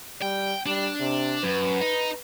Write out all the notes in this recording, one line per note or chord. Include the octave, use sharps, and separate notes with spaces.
G3 G5
G3 D4
C3
F#2 B4
D#4